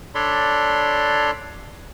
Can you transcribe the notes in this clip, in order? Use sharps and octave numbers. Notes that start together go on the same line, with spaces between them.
D4 A4 C#5 D5 B5 C6